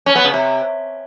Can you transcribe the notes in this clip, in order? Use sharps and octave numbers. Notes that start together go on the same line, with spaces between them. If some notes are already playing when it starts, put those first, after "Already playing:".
C#4
B3
C#3
C3